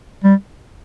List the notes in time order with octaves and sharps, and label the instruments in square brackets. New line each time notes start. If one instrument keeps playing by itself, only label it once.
[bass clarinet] G3